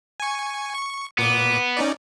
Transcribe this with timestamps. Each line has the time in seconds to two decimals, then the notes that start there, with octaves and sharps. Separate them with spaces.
0.20 G#5 C#6
0.74 C#6
1.18 A#2 B3 D6
1.77 C#4 D#4 D5